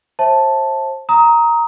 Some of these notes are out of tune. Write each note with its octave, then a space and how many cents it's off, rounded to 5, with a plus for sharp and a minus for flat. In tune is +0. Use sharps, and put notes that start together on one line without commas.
C5 +30 E5 -15 A5 +0
A#5 +0 D#6 +25